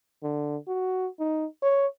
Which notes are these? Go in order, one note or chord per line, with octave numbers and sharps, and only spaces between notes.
D3
F#4
D#4
C#5